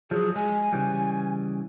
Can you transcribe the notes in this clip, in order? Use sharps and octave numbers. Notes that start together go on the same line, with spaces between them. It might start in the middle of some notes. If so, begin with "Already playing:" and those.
F3 F#3 G#4
G#3 G#5
C#3 E3 G3